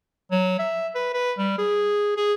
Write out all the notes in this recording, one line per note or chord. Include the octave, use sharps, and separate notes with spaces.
F#3
E5
B4
B4
G3
G#4
G#4